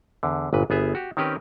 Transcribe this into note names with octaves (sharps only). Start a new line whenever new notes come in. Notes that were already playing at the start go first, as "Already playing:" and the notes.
E2 D3
G1 A#2 B4
G1 B3 G#4 E5
F#4 G4
D#3 C4 C#4 G4 A#4 B4